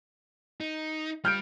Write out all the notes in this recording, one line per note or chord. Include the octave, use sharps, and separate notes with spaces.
D#4
G3 F6 G6 D7